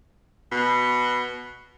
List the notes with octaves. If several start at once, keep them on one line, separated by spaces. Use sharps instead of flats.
B2